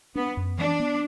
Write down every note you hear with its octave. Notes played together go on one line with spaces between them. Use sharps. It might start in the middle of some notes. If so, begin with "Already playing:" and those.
B3 D4
F#2
E3 D4
B3